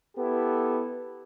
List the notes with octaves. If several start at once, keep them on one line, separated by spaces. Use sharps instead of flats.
B3 E4 G4 A4